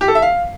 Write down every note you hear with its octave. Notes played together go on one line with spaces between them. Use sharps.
G4
A4
E5
F5